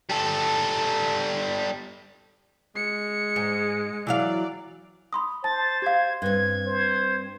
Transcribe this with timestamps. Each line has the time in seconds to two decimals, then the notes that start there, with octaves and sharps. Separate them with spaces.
0.09 G3 A4
2.76 G#3 C#7
3.36 G#2
4.07 E3 F#3 D5 F5
5.13 B5 C6 D#6
5.44 C5 A5 A6
5.82 G4 F5 G#6
6.22 G2 C4 G#6
6.67 C5